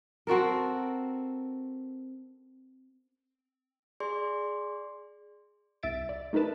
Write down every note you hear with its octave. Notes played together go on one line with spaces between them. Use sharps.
C4 F#4 A4 A#4
G#4 D5 C6
C2 E5 A6 D7
D5
A3 D#4 A#4 B4 A5